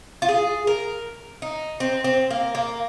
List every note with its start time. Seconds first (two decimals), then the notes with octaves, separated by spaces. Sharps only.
0.22 F4
0.29 G#4
0.67 A#4
1.42 D#4
1.80 C4
2.04 C4
2.31 A#3
2.55 A#3